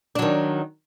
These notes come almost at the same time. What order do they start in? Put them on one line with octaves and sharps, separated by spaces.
D4 F#3 D#3